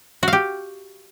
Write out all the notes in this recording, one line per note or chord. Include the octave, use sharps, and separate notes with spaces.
F#4 G4 F5